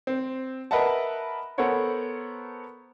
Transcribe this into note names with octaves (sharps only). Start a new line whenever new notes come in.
C4
A#4 B4 D#5 E5 F#5 A5
B3 A4 A#4 C5 C#5 F#5